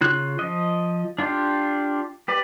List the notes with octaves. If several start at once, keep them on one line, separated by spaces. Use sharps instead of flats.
C#3 F4 F#6
F3 D#5
D4 F4 G4
G4 B4 D5